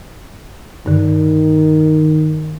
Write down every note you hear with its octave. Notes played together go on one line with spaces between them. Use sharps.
G2 D3 D#3